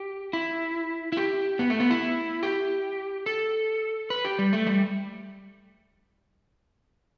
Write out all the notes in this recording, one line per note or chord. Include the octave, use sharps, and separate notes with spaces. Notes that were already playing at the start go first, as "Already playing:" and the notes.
Already playing: G4
E4
E4
G4
B3
A3
B3
E4
G4
A4
B4
G4
G3
A3
G3